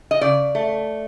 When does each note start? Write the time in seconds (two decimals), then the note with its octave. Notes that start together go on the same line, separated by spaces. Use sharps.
0.11 D#5
0.21 C#3 D5
0.55 A3